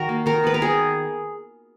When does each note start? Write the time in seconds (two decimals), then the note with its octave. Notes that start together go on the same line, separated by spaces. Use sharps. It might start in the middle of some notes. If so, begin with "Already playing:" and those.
Already playing: D#3 F#4 A#4
0.09 A#3
0.26 D#3 A#4
0.44 B3 B4
0.54 A#4
0.61 D#3 G#4